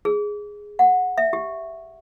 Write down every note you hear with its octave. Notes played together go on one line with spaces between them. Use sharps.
G#4
F#5
E5
G4